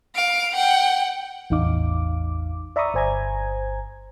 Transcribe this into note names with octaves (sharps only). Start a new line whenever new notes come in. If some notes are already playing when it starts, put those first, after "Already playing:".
F5 D7
F#5 G5
A1 E2 D#4 F5 D6
D5 E5 A#5 B5 C#6 D#6
G1 C5 G#5 A#5 G#6